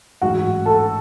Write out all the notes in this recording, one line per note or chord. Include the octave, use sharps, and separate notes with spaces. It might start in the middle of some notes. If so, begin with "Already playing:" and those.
A1 G#2 F#3 F#4 F#5
A4 A5